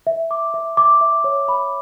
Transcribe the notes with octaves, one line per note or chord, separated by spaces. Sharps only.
E5
D6
E5
D6
E5
C#5
B5